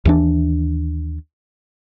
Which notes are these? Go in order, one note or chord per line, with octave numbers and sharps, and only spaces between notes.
D#2 E3 D4